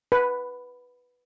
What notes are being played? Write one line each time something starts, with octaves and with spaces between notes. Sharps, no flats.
B4